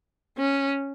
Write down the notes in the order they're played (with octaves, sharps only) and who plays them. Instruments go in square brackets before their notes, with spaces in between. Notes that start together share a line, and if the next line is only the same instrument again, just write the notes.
[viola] C#4